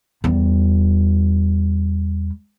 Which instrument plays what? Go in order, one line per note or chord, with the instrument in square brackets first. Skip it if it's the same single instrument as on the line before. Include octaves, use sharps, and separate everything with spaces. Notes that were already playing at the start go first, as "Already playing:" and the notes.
[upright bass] E2 G3